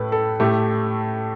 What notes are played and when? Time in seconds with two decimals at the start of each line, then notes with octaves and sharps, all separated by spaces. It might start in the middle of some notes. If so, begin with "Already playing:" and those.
Already playing: A2 A3 B4
0.12 A4
0.40 A2 A3 G4